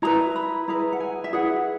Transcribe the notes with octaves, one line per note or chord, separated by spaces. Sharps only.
E4 G#4 B4 A#5
B5
E4 G#4 B4 A#5
F#5
G#5
E5
E4 G#4 B4 F#5